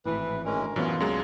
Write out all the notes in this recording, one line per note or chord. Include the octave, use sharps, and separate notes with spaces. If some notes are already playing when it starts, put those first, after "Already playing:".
G#1 A2 E3 B4
D2 E3 G#3 C#4 A#4
F#2 A2 D3 E3 B3 C#4 F4
C2 F#2 F#3 G#3